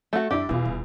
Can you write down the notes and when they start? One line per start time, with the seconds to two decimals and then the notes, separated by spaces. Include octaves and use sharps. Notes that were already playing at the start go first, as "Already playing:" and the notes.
0.13 A3 F#4
0.31 F#2 D4 E4 G4
0.49 E2 B2 B3 F4
0.65 D#1